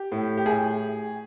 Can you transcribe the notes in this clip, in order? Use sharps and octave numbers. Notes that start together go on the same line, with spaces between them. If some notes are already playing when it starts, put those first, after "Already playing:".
Already playing: G4
A2
G4
A2 G#4